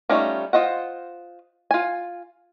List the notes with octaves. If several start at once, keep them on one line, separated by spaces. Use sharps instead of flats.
G3 A3 C#4 D#4 F4
F4 C5 D#5 F#5
F4 G#5